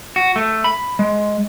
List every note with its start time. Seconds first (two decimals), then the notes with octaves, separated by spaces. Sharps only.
0.16 F#4
0.36 A3
0.64 B5
0.99 G#3